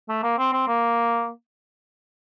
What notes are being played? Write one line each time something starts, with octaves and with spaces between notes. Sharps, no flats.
A3
A#3
C4
C4
A#3